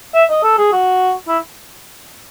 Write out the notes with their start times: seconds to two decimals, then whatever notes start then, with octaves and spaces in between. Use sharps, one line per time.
0.14 E5
0.30 D#5
0.43 A4
0.58 G#4
0.72 F#4
1.28 E4